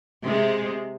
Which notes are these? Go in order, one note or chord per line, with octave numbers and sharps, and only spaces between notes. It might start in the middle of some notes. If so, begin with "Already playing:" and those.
C3 G#3